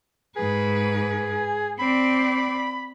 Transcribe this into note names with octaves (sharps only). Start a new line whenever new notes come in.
G#2 G#4 B4
C4 D5 B5